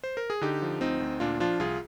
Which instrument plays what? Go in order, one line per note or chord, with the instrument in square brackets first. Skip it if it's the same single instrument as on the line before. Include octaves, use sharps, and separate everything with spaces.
[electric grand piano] C5
A#4
G#4
D3 D#4 G4
F3
D2 C4 D#4
D2
A#2 D4 F4
F3 D4 F4
C2 F4 G#4